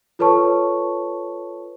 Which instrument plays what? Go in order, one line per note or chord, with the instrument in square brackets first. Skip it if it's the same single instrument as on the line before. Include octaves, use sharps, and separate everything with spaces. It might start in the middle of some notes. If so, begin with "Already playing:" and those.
[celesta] F4 A4 B4 C#5 A5 C#6